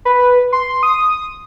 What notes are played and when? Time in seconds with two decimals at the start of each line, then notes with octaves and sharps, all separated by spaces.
0.05 B4
0.52 C6
0.83 D#6